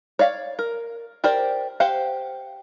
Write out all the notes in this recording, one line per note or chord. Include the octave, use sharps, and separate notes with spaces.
C#5 D5 F5
A#4
G4 A#4 C5 D5
G4 C5 F5 F#5